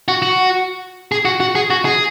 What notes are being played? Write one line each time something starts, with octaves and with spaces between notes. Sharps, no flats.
F#4
F#4
G#4
F#4
F#4
G#4
F#4
G#4